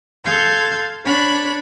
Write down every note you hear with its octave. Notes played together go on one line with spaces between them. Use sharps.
A4 F5 C6 G6 G#6
D4 C#5 B5 F#6